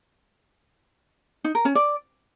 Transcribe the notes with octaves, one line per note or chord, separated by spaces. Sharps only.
D#4
A#4
C#4
D5